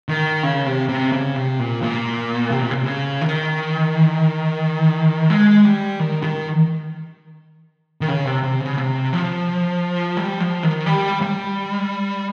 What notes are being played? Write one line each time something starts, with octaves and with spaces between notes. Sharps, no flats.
D#3
C#3
C3
C3
C#3
C3
A#2
A#2
C3
A#2
C3
C#3
D#3
G#3
G3
D#3
D#3
D#3
C#3
C3
C3
C#3
C3
F3
G3
F3
D#3
G3
G3